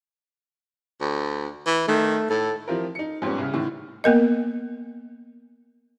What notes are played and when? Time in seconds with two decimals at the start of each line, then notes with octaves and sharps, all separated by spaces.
1.01 D2
1.67 E3
1.88 D#3 A3
2.30 A2 A4
2.68 F3 C4 E4 F4 G4 A#4
2.95 D#4 C#7
3.22 F2 G#2 G3 B3 C#4
3.38 C2 C#3 F6
3.53 A2 D3 D#3
4.04 A#3 B3 A#4 D#5